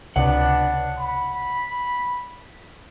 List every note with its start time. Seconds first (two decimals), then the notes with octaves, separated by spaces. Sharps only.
0.16 C#2 C3 B3 D4 C#5 F#5
0.98 B5